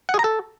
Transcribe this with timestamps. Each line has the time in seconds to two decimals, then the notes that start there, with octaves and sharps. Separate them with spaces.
0.09 F#5
0.14 G#4
0.19 A#5
0.24 A4